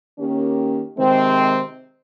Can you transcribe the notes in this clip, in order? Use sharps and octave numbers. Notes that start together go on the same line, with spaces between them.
D#3 A#3 C#4 G4
C3 D#3 G#3 C4